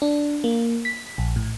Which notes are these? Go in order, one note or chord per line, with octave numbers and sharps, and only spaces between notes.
D4
A#3
B6
A#1
A2